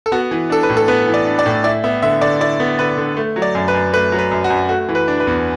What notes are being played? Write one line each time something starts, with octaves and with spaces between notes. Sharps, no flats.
A4
B3 F#4
E3
D4 A4
B4
A2
A4
B3 B4
E3
D5
D4
D5
A2
E4 D5
B3 E5
D3 E5
D3 D5
E4 D5
B3
D3 B4
D3
A3
F#3
D5
F#2
B4
F#2
A3 B4
F#3
B4
F#2
F#4
F#2
A3 F#4
E3
B4
D4
B4
E2